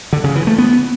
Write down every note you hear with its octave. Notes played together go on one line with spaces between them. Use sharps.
D3
C#3
E3
A3
B3